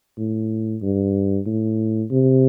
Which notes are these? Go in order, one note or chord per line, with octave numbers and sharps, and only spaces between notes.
A2
G2
A2
C3